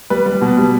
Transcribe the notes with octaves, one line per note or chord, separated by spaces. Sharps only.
G3 B4
G3
B2
G3